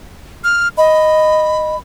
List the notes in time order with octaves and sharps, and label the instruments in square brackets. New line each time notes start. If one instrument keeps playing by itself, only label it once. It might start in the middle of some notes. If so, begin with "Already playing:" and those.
[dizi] F6
[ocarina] D#5 [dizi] B5